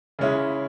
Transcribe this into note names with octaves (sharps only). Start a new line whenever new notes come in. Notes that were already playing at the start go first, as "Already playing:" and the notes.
C#3 G#3 C#4 E4